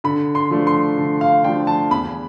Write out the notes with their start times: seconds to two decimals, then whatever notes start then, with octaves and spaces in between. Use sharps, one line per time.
0.04 D3 B5
0.35 C6
0.51 F3 A3 D4
0.67 C6
0.97 D3
1.21 F5
1.44 F3 A3 D4 G5
1.67 A5
1.91 E2 B5